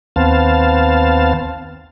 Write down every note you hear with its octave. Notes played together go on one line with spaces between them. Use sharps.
D#2 B3 C4 F5 A5